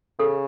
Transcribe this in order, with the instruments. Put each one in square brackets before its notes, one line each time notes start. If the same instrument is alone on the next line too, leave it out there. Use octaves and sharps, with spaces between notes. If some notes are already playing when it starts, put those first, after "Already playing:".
[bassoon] C#3 [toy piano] A4